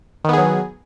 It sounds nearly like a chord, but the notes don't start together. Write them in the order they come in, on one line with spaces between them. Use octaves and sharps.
D#3 B3 G#4 F#3